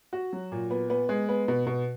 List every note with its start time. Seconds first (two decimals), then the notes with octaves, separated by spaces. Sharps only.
0.13 F#4
0.33 F#3
0.52 A#2
0.71 B3
0.90 B3
1.09 G#3
1.29 B3
1.48 B2
1.66 B2